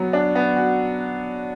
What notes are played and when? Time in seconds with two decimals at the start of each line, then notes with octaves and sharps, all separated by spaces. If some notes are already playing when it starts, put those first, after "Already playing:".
Already playing: F#3 B3 F#4
0.13 D4
0.35 B3
0.56 F#4